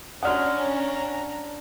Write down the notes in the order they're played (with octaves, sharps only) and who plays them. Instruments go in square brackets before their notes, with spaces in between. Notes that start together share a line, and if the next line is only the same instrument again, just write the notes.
[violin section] C#4 [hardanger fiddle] D4 A#5 [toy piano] F#4 D5 D#6 [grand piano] F#5 F6